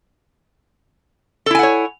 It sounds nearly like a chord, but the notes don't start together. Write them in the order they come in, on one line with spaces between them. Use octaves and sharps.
A4 E4 G#5 F#5 C#5